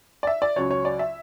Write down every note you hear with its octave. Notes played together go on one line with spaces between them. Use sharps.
D5
E5
D5
C#2 C#3 F#3 C#5
C#5
D5
E5